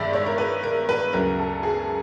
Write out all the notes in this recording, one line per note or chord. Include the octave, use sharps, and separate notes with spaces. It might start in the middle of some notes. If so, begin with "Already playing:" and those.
Already playing: G2 D#3 G#3 D5 E5
C#5
A#4
B4
A#4
B4
D2 C#3 F#3 A#4
A4
G#4